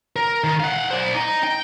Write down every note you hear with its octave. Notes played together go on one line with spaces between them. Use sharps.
A#4
D#3
F5 F#5
C5 D5
D#4
G5